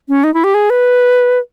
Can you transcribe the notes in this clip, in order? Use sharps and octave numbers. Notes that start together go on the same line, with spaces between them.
C#4
D#4
E4
G4
G#4
B4